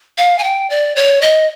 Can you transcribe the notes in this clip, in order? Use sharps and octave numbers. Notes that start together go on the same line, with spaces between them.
F5
G#5
G5
D5
C#5
D#5